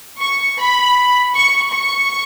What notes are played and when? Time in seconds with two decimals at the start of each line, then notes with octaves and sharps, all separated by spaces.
0.20 C#6
0.59 B5
1.35 C#6
1.73 C#6